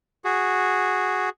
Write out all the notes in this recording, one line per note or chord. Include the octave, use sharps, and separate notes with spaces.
F#4 G#4